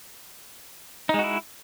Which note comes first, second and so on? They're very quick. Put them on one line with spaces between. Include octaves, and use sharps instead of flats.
D#4 G#3 F#4 E4